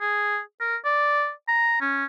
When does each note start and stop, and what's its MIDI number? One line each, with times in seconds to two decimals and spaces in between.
0.01 0.39 68
0.60 0.76 70
0.85 1.31 74
1.48 1.79 82
1.81 2.05 61